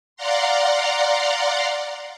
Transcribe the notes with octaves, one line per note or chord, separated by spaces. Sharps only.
D5 F5 F#5 A#5 C6